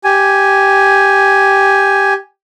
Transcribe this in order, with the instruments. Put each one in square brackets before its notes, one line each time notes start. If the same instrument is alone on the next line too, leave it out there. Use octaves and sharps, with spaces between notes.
[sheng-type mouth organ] G4 G#5